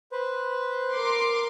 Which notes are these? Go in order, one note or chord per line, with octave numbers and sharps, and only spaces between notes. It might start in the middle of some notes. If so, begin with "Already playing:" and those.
B4 C5
A#4 C6 D6